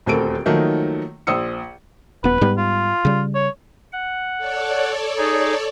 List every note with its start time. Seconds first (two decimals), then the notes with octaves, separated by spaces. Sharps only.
0.06 D#1 D2 C4 A4 A#4 D7
0.46 D#3 F3 F#3 A3 A#3 D#4
1.27 A#1 C5 D#6 E6 C#7
2.24 D#1 B3 B4
2.41 G#2 G3 B3
2.58 F4
3.05 C#3 G3
3.35 C#5
3.92 F#5
4.38 A4 C#5 D5
5.17 D#4 G#4